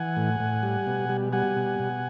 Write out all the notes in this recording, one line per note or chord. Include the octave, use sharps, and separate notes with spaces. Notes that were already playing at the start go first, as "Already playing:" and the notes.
Already playing: E3 F#5 G#5
A2
A2
G3
B2
G3
G3 F#5 G#5
B2
B2